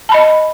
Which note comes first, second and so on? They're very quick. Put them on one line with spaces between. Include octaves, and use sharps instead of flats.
A5 B5 D#5